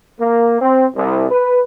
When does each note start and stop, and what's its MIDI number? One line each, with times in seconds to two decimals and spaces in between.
0.20 0.59 58
0.61 0.87 60
0.96 1.26 36
1.30 1.63 71